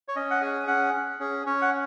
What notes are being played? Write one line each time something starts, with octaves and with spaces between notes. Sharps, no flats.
C#5
C#4 D#5
F#5
G#4 G#5
C#4 F#5
C#4
C#4 G#4
C#4 C#5
F#5